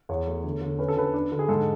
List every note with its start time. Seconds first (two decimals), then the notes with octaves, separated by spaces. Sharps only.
0.09 E2 C#5
0.27 A3
0.44 D3
0.61 D3
0.79 C#4 B4
0.88 A4
0.97 D3 B4
1.14 D4
1.32 D3
1.39 G#4
1.48 G#2 A4